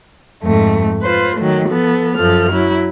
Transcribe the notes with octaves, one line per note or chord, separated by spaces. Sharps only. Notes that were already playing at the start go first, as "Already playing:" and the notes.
F2 G#2 A3
F4 B4 C5
D#3 F#3 A3
F3 B3 A4
F#2 F3 A4 F6
F#3 E4